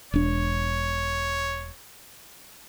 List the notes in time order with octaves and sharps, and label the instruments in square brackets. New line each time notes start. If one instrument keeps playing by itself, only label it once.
[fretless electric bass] E1 D4 [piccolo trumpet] C#5